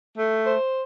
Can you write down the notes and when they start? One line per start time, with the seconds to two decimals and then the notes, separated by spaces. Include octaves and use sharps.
0.18 A3
0.45 C5